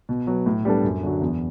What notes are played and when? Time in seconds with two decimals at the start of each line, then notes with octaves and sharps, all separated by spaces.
0.09 B2
0.27 F#3 B3
0.46 A2
0.65 G3 B3 D4 A4
0.84 F#2
1.03 D3 F#3
1.21 E2